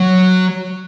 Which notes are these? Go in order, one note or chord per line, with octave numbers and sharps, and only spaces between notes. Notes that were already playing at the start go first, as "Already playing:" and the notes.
Already playing: F#3